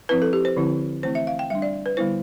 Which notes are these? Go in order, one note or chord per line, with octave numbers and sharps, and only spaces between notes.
F3 C4 E4 B4
A4
G4
C5
D3 F3 C4 E4
E3 A3 C4 E4 C5
E5
F5
G5
G3 D4 E5
D5
B4
D3 G3 B3 E4 C5